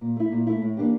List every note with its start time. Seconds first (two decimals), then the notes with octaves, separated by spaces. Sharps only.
0.01 A#2
0.16 A3 E4
0.32 A#2
0.47 A3 E4
0.62 A2
0.77 E3 A#3 D4 G4